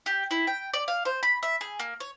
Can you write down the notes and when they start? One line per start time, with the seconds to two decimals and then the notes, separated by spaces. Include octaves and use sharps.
0.06 G4
0.31 E4
0.47 G5
0.73 D5
0.88 F5
1.05 C5
1.23 B5
1.43 E5
1.61 G#4
1.79 A#3
2.00 C#5